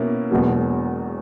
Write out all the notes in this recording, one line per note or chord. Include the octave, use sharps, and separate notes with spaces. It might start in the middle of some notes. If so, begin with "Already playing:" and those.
Already playing: B2 A#3 C#4 E4
E1 E2 B2 F#3 A#3